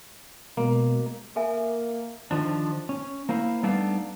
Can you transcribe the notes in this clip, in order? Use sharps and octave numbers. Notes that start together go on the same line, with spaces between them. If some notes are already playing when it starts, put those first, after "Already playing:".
B2 G#3 A#3
A#3 A4 E5 G#5
D3 D#3 F3 D4
C#4
A#3 E4 C5 F5
G3 A3 B3 D4 D#4 F5